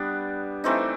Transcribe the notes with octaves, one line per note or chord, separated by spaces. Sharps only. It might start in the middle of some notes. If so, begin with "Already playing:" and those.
Already playing: G3 B3 D4
E3 A3 C4 D#4